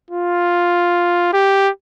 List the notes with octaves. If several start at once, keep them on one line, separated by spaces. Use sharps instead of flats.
F4
G4